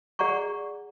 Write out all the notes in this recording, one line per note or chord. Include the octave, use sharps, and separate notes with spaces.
G#4 D5 F#5 A#5 C#6